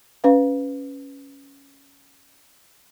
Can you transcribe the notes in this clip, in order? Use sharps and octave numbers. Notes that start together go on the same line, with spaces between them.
C#4 B4 F5